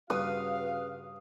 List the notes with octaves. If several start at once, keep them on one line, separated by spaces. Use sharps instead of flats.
G2 C#3 F#4 B4 F5 D#6